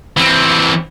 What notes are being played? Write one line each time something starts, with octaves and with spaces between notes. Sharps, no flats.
E3 C4